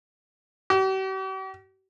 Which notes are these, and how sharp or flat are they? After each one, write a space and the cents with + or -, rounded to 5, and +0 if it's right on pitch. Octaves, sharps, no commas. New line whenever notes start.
G4 -45